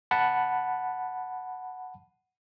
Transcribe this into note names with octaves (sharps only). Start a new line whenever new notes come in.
F#5 A5 B5